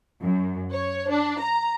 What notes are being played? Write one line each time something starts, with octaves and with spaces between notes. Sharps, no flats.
F#2
C#5
D4
A#5